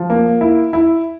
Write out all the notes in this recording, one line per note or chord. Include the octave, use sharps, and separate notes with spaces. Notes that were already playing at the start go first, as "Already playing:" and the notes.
Already playing: F3
A#3
E4
E4